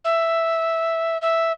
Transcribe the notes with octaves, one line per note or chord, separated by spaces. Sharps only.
E5
E5